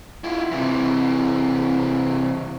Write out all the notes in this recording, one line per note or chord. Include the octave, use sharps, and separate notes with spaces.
E4 F4
C3 E3